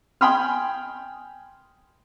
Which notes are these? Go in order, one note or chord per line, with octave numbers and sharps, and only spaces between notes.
G5 G#5 B5 C6 D#6 F6